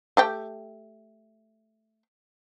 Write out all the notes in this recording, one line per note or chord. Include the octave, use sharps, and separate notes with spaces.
A3 G4 G5